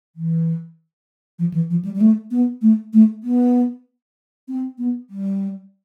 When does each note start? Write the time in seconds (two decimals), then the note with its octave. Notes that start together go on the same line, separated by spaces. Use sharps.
0.16 E3
1.39 F3
1.54 E3
1.70 F3
1.85 G3
1.95 G3
2.01 A3
2.31 B3
2.62 A3
2.93 A3
3.24 B3
4.48 C4
4.78 B3
5.10 G3